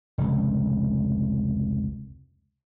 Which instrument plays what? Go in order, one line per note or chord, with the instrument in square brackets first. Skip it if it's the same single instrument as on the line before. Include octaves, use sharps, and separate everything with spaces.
[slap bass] F1 C#2